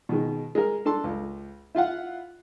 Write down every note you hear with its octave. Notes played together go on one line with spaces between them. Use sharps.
B2 D#3 G#3
G#3 A#4
D4 A4 A5 C6
C#2
E4 F4 F5 F#5